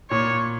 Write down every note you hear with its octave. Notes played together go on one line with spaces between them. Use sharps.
A#2 C#5